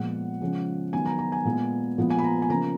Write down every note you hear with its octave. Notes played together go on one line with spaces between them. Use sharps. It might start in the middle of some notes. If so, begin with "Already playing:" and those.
Already playing: A#2 F3 G#3 B3 F#5
C#3 F3 G#3
D#3 F#3 B3 G#5
A#5
A#5
G#5
A#2 G#3 B3
A#2 F3 G#3 B3
G#5
B5
A#5
G#5
C#3 F3 A#3 A#5